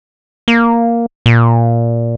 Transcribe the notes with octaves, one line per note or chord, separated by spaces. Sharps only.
A#3
A#2